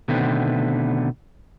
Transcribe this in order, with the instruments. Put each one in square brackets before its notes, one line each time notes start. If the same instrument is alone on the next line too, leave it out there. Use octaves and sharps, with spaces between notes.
[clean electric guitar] B2 D3 D#3 A3 B3 C4